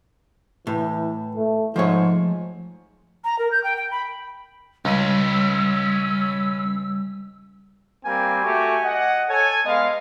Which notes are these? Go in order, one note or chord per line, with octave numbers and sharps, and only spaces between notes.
A2 E3
A3
G#2 F3 A3 C#5
A#5
A#4
G6
G5
G5
B5
C#2 G3 C#4 B4 E6
G3 A#3 C4 G#5
A3 F#4 G4
D#5 F#5
A4 C#5 G#5
G#3 B3 D#5 F5